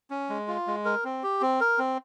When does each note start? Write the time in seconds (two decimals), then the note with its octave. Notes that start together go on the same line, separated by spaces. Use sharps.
0.10 C#4
0.30 G#3
0.48 F4
0.67 G#3
0.85 A#4
1.04 C4
1.23 G4
1.41 C4
1.60 A#4
1.79 C4